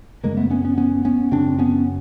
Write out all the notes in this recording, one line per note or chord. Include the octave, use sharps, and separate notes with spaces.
F#2 C#3 G#3 A#3
A3 B3
B3 C#4
B3 C#4
B3 C#4
B3 C#4
F#2 C#3 C4 D4
B3 C#4